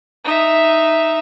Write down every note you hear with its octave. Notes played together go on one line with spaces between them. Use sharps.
D#4 E5